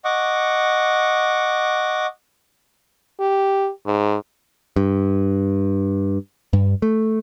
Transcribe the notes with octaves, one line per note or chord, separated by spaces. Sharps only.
D#5 F#5 C#6 D6
G4
G#2
G2
G2
A3